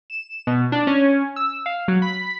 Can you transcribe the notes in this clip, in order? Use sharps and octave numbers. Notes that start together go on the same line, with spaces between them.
E7
B2
D4
C#4
E6
F5
F#3
B5